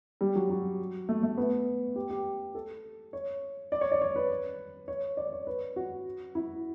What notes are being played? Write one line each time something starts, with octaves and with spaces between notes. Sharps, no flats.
G3
F#3
F#3
A3
A3
B3
G4
G4
A4
C#5
D5
C#5
D5
C#5
B4
C#5
D5
C#5
B4
F#4
E4